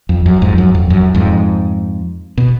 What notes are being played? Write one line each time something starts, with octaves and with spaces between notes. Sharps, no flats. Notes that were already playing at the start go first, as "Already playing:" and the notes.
F2
F#2
F2 G#2
F#2
F2
F#2
F2 G#2
B2